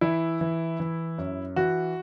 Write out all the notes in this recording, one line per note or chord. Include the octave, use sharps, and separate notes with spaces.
E3 E4
E3
E3
F#2
E3 F#4